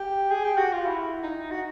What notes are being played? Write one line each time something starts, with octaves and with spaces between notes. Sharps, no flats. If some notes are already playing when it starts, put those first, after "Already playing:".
Already playing: G4
G#4
G4
F#4
F4
E4
D#4
F#4